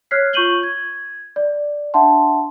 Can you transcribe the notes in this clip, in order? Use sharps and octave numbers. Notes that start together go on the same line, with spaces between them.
C#5 F6 F#6 G#6 B6 C7
F4 C#6 G6 D#7 F#7 G7
G#6
D5
D4 E5 F#5 A5 C6